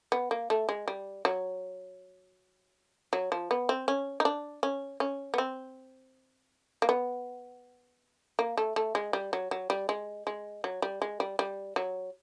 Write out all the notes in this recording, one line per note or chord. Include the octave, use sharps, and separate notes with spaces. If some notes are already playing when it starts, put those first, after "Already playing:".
B3
A#3
A3
G#3
G3
F#3
F#3
F3
B3
C4
C#4
D#4
D4
C#4
C#4
B3
C4
A#3
B3
A#3
A3
A3
G#3
G3
F#3
F#3
G3
G#3
G#3
F#3
G3
G#3
G3
G3
F#3